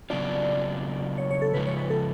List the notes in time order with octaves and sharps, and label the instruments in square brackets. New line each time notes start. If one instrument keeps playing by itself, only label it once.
[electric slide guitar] C#3 F#3 B3 D4 F4 [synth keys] D5
[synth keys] C#5
C#5
A4
[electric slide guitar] C#3 F3 G#3 [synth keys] B4
[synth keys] C#5
B4
A4